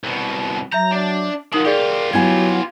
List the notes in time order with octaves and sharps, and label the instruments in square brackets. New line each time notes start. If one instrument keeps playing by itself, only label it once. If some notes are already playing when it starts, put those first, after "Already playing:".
[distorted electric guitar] C2 B2
[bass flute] F#3 [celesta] E5 G6 [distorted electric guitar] A#5
[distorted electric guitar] D4
[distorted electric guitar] F3 F#3 [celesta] D#4 D#6 F#7 [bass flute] A#4
[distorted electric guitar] F4 G4 [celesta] G#4 D5 F5
[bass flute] F#3 [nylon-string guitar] B3 E4 G#5 [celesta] G#6